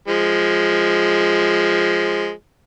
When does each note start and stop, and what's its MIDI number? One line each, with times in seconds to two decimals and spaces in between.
0.08 2.31 53
0.08 2.31 56